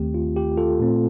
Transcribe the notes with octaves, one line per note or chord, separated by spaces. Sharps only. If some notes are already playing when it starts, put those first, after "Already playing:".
Already playing: D#2 D#3 A3 C4 G4
F4
G4
F4 A4
A#2 A3 C4